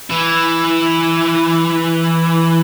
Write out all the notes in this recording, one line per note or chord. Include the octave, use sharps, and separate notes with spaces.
E3 E4